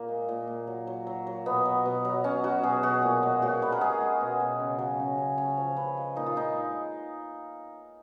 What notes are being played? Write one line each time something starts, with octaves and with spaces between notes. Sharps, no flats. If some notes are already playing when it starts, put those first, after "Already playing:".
Already playing: A#2 A#3
G#3
A#2
A#2
F#3
F#3
F#3
F#3
B2 B3
F#3
B2
F#3
B2 C#4
F#3 F#4
B2 G#4
B2 F#4
A#2
G#3
A#2 F#4
G#3 B4
A#4
G#3 G#4
G#3
B2
B2
C#3
F#3
C#3
C#3
C#3 C#5
F3
C#3 B4
G#3
A#2 D#4
F4
G#3 D#4